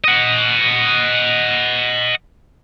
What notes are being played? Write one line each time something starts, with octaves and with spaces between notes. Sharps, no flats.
D#5 F#5